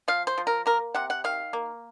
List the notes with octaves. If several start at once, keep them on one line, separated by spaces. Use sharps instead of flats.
F3 F5
C5
F3
A#4
A#3 A#4
C3 F#5
F#5
D#3 F5
A#3